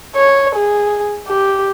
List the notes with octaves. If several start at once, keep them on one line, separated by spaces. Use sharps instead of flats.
C#5
G#4
G4